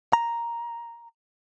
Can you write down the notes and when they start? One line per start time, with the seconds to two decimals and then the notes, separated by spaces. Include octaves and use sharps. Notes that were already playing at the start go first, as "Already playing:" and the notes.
0.13 A#5